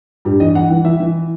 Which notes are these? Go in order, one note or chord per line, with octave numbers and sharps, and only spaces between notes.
G2 G4
E3 D#5
E3 F#5
E3
E3 E5
E3